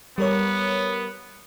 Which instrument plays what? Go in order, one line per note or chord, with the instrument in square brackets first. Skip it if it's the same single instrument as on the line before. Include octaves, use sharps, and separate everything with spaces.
[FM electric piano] G3 A#4 C#5 [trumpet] B3